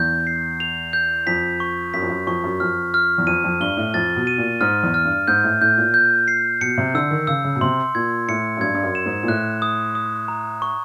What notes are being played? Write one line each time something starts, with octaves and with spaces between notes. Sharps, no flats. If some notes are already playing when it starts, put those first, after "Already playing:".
Already playing: E2 G6
C7
F7
G6
F2 B6
C#6
F#2 B6
F2
F#2
F2 C#6
F#2
F2 F6
F6
E2
F2 D#7
F2
G2 G7
A2
F2 A6
B2
D#7
A#2
G#2 F6
E2
F6
G2
G#2 G6
A2
A2 G6
A#2
G6
C7
B2 C#7
C3
D3 E6
D#3
C#3 E6
C#3
B2
C3 C6
A#2 G#6
A2 C#7
F#2
G2 G#6
G2
F#2
E7
G#2
A#2
A2 F#6
D#6
D#6
A#5
C#6